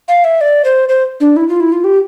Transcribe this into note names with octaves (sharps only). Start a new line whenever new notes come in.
F5
E5
D5
C5
C5
D4
E4
F4
E4
F4
G4